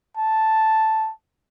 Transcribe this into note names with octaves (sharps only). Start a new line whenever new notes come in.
A5